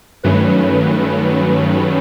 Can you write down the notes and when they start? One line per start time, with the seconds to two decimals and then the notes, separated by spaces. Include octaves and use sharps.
0.23 G2 D#3 F#3 A3 C#4 B4
1.70 B4